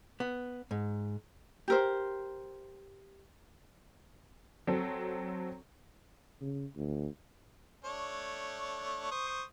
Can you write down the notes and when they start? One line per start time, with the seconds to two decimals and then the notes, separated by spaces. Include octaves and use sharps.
0.20 B3
0.71 G#2
1.68 G4 A#4 C5
4.67 F#3 C4 A4
6.41 C#3
6.77 D2
7.84 A3 D4 C#5
9.11 C5 C#6 D#6